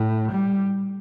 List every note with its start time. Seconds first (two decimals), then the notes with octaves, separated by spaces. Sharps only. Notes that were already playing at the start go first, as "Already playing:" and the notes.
Already playing: A2
0.32 G3